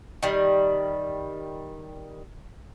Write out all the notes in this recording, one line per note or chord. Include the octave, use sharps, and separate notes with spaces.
D#3 G3